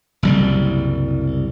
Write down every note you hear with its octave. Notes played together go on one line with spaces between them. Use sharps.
F#1 C2 G3